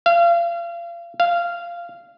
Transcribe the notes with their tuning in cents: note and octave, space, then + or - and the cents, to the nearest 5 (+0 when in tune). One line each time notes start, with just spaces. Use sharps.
F5 -35
F5 -15